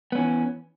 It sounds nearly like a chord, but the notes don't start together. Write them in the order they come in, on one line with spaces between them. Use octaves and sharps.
B3 C#4 E3